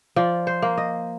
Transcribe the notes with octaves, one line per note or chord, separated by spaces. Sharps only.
F3 D5
C5
A#3
D#5